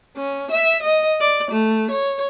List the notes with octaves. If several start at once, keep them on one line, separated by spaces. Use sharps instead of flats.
C#4
E5
D#5
D5
A3
C#5